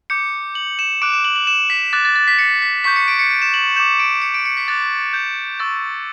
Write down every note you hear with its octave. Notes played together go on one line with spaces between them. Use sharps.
D6 G6 C#7
F#7
E7
D6 F#6 D7
E7
F#7
F#7
E7
B6
D6 F#6 A6
A6
A6
B6
C#7
B6
C#6 G6 B6
C#7
D7
C#7
D7
E7
F#7
D6 G6 E7
D7
C#7
D7
C#7
B6
D6 F#6 A6
G6
C#6 E6 G6 A6